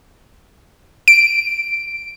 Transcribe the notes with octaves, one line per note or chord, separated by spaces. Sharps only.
D7